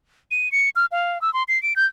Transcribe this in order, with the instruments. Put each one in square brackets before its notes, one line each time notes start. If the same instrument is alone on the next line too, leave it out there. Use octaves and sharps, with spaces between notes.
[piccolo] D#7
C#7
F6
F5
E6
C6
C7
D7
G6